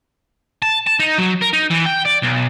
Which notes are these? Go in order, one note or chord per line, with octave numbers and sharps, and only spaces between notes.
A5
A5
D#4
F#3
A#4
D#4
E3
G5
D5
B1